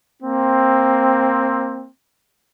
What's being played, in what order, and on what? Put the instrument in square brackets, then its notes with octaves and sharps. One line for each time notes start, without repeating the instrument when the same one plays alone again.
[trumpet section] A#3 C4